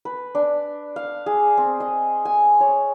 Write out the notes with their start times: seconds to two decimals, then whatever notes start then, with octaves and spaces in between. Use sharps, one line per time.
0.05 B4
0.35 D4
0.96 F5
1.26 G#4
1.57 C4
1.80 D#5
2.25 G#5
2.61 C#5